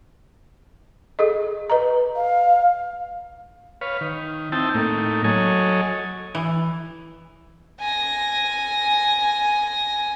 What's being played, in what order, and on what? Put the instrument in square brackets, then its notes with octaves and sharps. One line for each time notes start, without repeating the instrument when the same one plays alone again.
[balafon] G#4 A4 D#5
B4 D#5 A#5
[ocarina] F5
[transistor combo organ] B4 C#5 F5
D#3
C4 D#4 E4 G5 A5
A2 A3 A#3 D#4
F#3 A4 C#5 D#5 G#5
[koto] E3
[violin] G#5 A#6